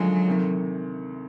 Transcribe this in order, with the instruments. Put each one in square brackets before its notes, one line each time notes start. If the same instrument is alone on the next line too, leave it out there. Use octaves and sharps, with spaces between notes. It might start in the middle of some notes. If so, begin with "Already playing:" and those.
Already playing: [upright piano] F#2 D3 F3 G#3 [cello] F#3
[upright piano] D2 C3 D#3